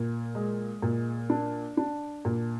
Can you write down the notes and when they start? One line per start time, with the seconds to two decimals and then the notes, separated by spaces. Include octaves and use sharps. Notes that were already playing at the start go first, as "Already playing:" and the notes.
Already playing: A#2
0.35 G#3
0.82 A#2
1.30 D4
1.77 D4
2.25 A#2